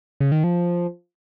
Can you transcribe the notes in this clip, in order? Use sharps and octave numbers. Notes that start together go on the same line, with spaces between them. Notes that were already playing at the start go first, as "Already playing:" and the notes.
C#3
D#3
F3